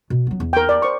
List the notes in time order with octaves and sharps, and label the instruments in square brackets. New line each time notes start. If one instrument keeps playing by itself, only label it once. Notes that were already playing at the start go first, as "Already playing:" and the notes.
[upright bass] B2
F#3 B3
E2
[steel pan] A#4 G5
D5
C5 C#6